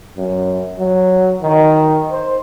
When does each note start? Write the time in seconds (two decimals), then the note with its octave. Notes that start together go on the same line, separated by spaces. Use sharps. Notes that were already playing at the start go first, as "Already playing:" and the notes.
0.16 F#2
0.78 F#3
1.41 D#3
2.11 C5